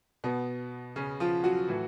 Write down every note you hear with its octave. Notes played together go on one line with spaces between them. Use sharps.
B2 B3
C#3 C#4
F3 F4
F#3 F#4
A2 E3